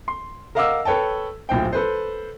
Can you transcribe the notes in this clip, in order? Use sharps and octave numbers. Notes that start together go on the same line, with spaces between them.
C6
A#4 D#5 F5 F#5 D6 E6
A4 B4 C#5 G5 A5
D1 A#1 C5 G5
A4 B4 C5